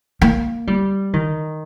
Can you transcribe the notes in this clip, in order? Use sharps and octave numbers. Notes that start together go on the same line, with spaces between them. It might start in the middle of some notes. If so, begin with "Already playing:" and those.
A#3
G3
D#3